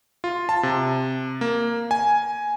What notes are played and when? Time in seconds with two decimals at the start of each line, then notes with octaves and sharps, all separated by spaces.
0.24 F4
0.49 A5
0.63 C3
1.41 A#3
1.91 G#5